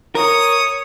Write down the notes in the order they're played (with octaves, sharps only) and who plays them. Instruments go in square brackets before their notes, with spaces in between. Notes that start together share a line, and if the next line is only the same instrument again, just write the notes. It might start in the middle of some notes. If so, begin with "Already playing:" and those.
[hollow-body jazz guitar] A#4 [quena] C#5 [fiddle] D#6